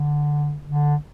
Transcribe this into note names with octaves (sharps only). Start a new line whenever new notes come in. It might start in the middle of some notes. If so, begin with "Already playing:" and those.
Already playing: D3
D3